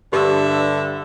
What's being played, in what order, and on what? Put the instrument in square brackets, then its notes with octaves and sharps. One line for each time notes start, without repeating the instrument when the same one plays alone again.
[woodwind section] G2 [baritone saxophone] D3 [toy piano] G4 [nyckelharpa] E5